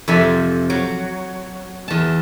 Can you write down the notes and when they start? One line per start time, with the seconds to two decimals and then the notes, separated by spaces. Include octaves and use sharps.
0.08 F2 C3 F3 E5 G#5
0.70 F#3
1.88 E2 A5